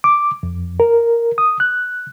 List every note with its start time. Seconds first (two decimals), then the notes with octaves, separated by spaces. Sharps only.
0.04 D6
0.43 F2
0.80 A#4
1.38 D#6
1.60 F#6